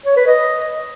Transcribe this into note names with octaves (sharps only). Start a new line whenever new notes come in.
C#5
B4
D#5